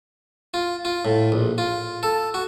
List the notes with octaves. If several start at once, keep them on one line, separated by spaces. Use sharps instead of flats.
F4
F4
A2
A#1
F4
A4
F#4